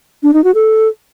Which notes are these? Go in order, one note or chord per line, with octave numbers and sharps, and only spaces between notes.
D4
D#4
F#4
A4